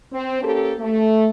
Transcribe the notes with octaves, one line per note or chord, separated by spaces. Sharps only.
C4
A#3 C#4 G4 A4
A3